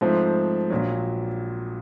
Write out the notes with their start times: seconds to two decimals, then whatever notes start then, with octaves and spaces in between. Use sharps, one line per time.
0.01 G#2 F3 A3 C4
0.70 A#1 A#2 F#3